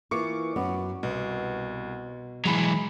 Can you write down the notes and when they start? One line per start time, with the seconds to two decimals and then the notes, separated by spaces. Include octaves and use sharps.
0.11 E3 A#3 F4 C#6 D6 C#7
0.56 F#2 B3
1.03 C2 B2
2.45 E3 F#3 G#3 B5 C#7